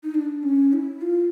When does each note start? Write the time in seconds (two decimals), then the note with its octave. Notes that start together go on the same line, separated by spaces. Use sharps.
0.03 D#4
0.15 D4
0.43 C#4
0.73 E4
1.01 F4